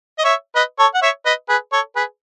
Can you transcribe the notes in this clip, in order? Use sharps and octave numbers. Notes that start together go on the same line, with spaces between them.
D#5
C#5 E5
B4 D#5
A4 C#5
F#5
C#5 E5
B4 D#5
G#4 B4
A4 C#5
G#4 B4